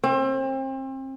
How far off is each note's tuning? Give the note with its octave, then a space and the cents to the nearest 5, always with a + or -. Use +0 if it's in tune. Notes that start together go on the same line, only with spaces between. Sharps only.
C4 +35